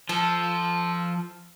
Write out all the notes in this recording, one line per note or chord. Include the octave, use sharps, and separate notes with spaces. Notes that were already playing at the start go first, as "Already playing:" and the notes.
F3 A4